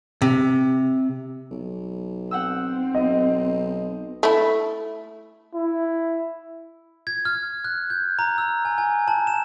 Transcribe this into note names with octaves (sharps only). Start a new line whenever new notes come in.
C3
B1
C4 F#5 G5 E6
B1 D#5
A3 E4
E4
G#6
F6
F#6
G6
A#5
E6
G#5
G#5
A5
E7